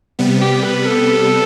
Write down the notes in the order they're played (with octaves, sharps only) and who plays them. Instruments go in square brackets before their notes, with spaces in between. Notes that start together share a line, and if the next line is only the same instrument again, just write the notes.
[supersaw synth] C3 G3 B3
[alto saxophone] G4
B4
A4